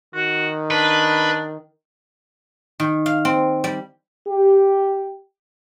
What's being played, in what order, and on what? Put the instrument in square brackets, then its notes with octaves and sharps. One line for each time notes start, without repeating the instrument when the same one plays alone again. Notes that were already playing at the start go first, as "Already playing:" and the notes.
[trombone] D#3 [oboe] F#4
[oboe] D4 [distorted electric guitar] B4
[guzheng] D#3
F5
C4
G3
[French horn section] G4